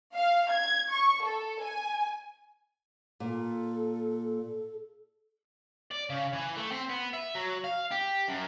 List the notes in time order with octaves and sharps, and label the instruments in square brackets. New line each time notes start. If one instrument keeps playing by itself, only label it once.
[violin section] F5
G#6
C#6
A4
G#5
[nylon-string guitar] A#2 [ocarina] A4
[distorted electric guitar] D5
C#3
E3
A3
C4
B3
E5
F#3
F5
G4
F#2